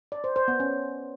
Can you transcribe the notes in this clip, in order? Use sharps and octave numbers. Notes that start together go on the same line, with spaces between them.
D5
C5
C5
B3
C#4